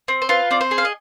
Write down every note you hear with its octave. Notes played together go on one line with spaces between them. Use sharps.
C4
C5
F4 B4
C4 D5
C5
G#4
F5
D#5